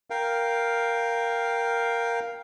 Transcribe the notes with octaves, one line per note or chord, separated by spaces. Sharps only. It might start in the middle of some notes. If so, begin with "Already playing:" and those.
A#4 F5 G5